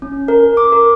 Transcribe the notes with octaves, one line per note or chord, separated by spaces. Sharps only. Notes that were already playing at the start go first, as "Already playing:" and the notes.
C#4
A#4
D6
A#4